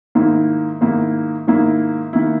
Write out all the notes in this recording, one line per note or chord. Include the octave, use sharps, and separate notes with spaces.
G#2 D#3 A#3 E4
G#2 D#3 A#3 E4
G#2 D#3 A#3 E4
D#3 A#3 E4